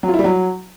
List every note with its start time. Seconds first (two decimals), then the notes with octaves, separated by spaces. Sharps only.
0.03 F#3
0.08 F4
0.14 E4
0.19 G3
0.24 F#3